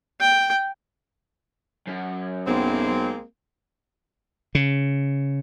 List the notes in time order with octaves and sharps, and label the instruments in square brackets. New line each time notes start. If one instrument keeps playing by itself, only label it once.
[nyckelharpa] G5
[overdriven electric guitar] F#2
[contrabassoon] B1 [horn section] G#3 A#3 C4
[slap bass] C#3